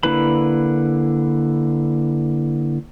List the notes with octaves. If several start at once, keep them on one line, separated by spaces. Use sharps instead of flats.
D3 A#3 E4 B4 B5